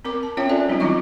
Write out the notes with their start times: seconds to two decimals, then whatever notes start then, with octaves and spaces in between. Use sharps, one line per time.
0.05 C4 A#4 D6
0.23 A5
0.37 C4 C#4 F4 C#5 E5 G5
0.49 C#4 A4 D5 G#5
0.68 F#3 G3 C4 C#4 D#4 F4
0.80 D#3 C4 E4 F4 D#5 C#6